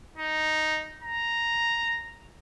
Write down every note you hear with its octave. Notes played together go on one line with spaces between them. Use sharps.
D#4
A#5